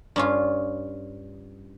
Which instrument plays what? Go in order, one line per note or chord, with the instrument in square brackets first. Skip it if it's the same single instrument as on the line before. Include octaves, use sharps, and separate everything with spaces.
[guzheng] G2 C#4 F4